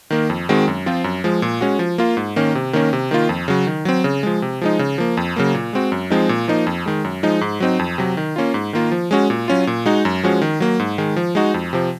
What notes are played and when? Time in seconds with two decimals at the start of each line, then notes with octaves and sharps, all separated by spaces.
0.10 D#3 A#3
0.30 F2
0.49 D#3 G#3 C4 F#4
0.68 F#2
0.86 F3 C4 F4
1.04 F#2
1.24 F3 G#3
1.42 A#2
1.61 G#3 C#4 F#4
1.79 F3
1.98 A#3 F4
2.17 G#2
2.36 D#3 A#3 C#4
2.55 C3
2.73 D#3 A#3 C#4
2.93 C3
3.11 D#3 A#3 F4
3.29 F2
3.48 C#3 F#3
3.67 D#3
3.85 F#3 C4
4.04 C#3
4.23 F3 G#3
4.42 C3
4.61 F3 G#3 D#4
4.79 C#3
4.98 F3 A#3
5.17 F2
5.36 C#3 F#3 A#3
5.54 A#2
5.73 G#3 C4 F#4
5.92 F#2
6.10 F3 G#3 C4 D#4
6.29 A#2
6.48 F3 A#3 D#4
6.67 F2
6.86 D#3 G#3
7.04 F#2
7.23 F3 G#3 D#4
7.41 G#2
7.60 F#3 C4 D#4
7.79 F2
7.98 C3 F#3
8.17 D#3
8.36 A#3 C#4 F4
8.54 G#2
8.73 D#3 A#3 F4
8.92 F3
9.11 G#3 C#4 F#4
9.30 A#2
9.48 F#3 C#4 F4
9.67 A#2
9.86 G#3 D#4 F#4
10.05 F#2
10.23 F3 G#3 C#4 F#4
10.42 D#3
10.60 F#3 A#3
10.79 G#2
10.98 D#3 G#3
11.16 F3
11.35 G#3 D#4 F#4
11.54 F2
11.73 C3 F3